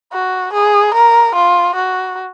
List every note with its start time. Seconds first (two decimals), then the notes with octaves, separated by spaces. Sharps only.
0.13 F#4
0.53 G#4
0.95 A#4
1.35 F4
1.76 F#4